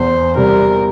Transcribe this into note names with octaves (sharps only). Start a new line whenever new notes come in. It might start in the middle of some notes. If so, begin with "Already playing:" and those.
Already playing: E2 C5
C3 G3 A#4